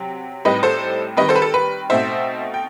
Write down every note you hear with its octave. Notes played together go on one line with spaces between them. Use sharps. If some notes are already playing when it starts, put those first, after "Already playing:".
Already playing: C3 F#3 C4
A2 G3 C4 D#4 B4 D#5
A4 C5
D#3 G3 C4 B4 D#5
A4 C5
B4
A4
B4
B2 A3 C4 D#4 C5 E5
G5